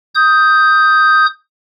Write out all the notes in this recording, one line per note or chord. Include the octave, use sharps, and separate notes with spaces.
D#6 G6